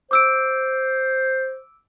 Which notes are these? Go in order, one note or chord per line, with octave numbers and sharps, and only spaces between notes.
C5 D6 E6 D7